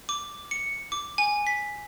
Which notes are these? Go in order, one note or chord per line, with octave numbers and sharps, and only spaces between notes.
D6
C#7
D6
G#5
B6